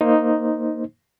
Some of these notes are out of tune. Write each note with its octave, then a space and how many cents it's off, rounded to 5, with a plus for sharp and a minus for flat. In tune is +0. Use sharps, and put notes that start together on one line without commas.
A#3 +0 D#4 +0 C5 +5